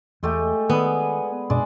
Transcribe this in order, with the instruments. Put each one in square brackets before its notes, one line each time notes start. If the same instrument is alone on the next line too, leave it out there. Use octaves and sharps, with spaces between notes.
[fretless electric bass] E2 [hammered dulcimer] G#3 A3 G4
[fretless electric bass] D#3 [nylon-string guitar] B3 [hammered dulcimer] G#4 B4 D5
[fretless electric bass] F#2 B2 D4 [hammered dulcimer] G#3 D5